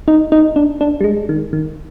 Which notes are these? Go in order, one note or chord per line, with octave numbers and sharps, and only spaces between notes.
D#4
D#4
D4
D4
G3
G#3
D#3
D#3